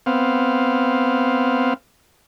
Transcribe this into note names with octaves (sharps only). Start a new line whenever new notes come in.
B3 C4 F5